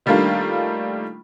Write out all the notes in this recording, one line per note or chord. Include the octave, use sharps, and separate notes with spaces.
D#3 G3 A3 A#3 D4 F4